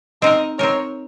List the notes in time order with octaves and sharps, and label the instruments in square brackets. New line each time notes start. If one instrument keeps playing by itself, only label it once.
[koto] C4 D#4 A#4 [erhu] D#5
[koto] C4 D#4 A#4 [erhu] C#5